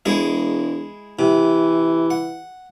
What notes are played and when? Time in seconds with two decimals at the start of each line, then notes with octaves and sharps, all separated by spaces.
0.06 E1 G#3 E4 G#4
1.19 C3 E3
2.10 F#5